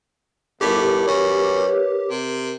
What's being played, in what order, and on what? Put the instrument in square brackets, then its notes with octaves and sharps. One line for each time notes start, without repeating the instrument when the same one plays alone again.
[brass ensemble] G1 [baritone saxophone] A2 [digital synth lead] G4 [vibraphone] A#4
[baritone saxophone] F#2 [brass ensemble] B4 C#5
[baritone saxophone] C3